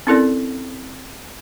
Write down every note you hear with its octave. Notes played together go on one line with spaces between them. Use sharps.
C4 C#4 E4 A4 A#4 D5